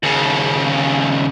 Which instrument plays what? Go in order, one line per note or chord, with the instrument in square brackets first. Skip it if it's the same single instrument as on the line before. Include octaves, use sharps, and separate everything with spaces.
[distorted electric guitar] D#2 C#3